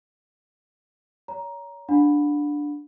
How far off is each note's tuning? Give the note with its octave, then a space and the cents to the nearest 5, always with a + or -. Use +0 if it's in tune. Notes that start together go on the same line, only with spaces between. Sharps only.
C#5 +30 A#5 +10
D4 +0 F#5 -40 B5 +0